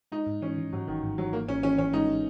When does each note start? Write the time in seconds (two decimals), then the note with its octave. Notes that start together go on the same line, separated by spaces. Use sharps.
0.12 G#3 D#4
0.27 G#2
0.42 E3 C#4
0.58 E3
0.73 G#2 F#3
0.87 G#1 D#3
1.03 G#2
1.18 E3 F#3
1.32 G#2 A#3
1.48 G#1 C#4
1.63 E3 C#4
1.78 E3 C#4
1.93 G#3 D#4
2.09 G#3